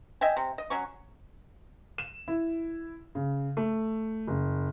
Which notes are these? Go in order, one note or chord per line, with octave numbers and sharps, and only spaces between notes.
D#5 E5 G5 G#5
C3
D#5
F#3 C#4 C#6
E7
E4
C#3
A3
F#1